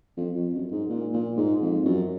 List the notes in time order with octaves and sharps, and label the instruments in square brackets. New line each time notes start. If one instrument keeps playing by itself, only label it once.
[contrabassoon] F2
F2
F#2
G#2
A#2
A#2
G#2
F2
F#2